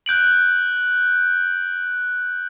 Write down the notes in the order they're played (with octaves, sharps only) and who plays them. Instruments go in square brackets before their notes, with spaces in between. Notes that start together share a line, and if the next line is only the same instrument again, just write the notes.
[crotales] F#6 G6 D7 F#7